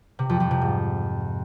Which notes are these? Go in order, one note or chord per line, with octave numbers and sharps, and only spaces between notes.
C3
F2
F2
C3
G#2